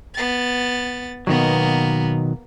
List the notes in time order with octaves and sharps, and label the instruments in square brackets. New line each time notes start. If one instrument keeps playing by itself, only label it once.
[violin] B3 A6
[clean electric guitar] B2 D#3 F#3 [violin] A#3 B3